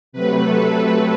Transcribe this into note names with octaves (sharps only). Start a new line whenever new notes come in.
C3 F#3 A3 B4
A4
A4